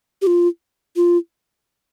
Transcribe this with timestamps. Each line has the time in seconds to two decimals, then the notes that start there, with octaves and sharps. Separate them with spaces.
0.22 G4
0.27 F4
0.96 F4